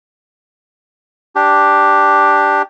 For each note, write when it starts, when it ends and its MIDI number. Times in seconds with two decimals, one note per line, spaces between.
1.36 2.62 62
1.36 2.62 67